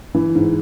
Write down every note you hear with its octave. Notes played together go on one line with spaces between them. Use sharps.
E3
G#2